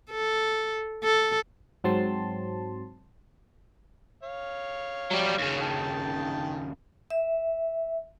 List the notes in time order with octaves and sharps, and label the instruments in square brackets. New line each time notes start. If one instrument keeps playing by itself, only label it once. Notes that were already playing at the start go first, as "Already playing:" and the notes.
[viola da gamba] A4
A4
[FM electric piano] G#2 F#3 C4 A5 C6
[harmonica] C#5 F5
[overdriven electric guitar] F#3 G3
D#2 C#3
[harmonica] D#3 G5 A5
[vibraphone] E5